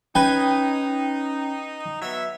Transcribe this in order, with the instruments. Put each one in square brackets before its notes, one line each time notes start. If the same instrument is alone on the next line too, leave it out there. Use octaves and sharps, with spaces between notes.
[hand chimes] C#4 [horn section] D#4 [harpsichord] B4 G#5 [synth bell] G5
[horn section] F#3 B3 E5